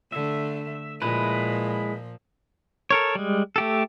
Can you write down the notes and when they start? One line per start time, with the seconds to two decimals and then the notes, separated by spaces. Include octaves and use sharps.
0.12 D3 A3 E5
1.02 A#2 F3 G#3 E4 B4
2.91 A4 A#4 C#5
3.15 G3 G#3
3.56 A3 G4 A4